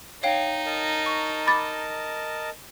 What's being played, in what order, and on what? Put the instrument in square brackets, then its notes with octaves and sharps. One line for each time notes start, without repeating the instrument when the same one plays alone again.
[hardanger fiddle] D#4 [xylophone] C#5 F5 G5
[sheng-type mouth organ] A#4 D#5 A5
[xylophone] C#6
[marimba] B5 D6 A6